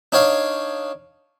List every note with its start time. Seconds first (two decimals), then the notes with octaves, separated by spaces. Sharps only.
0.12 D4 D#4 C#5 F5